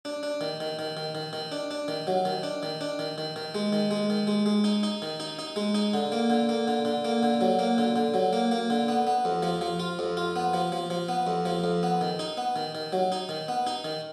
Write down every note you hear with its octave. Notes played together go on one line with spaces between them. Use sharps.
D4
D4
D#3
D#3
D#3
D#3
D#3
D#3
D4
D4
D#3
F#3
D#3
D4
D#3
D4
D#3
D#3
D#3
G#3
D#3
G#3
D#3
G#3
G#3
D#4
D#4
D#3
D#4
D#4
G#3
D#4
D3
A#3
D3
A#3
D3
D3
A#3
D3
F#3
A#3
D3
D3
F#3
A#3
A#3
D3
B3
B3
F2
F3
F3
F4
F2
F4
B3
F3
F3
F3
B3
F2
F3
F2
B3
D#3
D#4
B3
D#3
D#3
F#3
D#4
D#3
B3
D#4
D#3